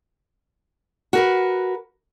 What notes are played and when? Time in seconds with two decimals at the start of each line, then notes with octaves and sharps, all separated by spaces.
1.13 F#4 A#4 B4